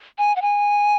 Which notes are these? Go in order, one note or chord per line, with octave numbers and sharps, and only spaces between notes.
G#5
F#5
G#5